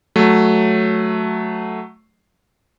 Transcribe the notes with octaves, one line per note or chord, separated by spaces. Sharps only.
F#3 A3